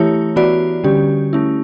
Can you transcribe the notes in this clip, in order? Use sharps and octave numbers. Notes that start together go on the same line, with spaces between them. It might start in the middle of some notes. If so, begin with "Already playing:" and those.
Already playing: E3 A3 E4 G4 C#5
E3 B3 F#4 B4 D5
D3 G3 C#4 G4
A3 C#4 E4